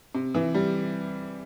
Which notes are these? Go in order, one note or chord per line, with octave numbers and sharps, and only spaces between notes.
C3
E3
G3